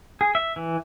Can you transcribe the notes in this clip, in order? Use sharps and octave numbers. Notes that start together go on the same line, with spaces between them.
G#4
E5
E3